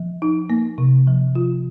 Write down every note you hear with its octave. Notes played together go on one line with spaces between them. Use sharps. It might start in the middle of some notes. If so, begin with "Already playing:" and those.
Already playing: F3
D#4
A#3
C3
F3
F4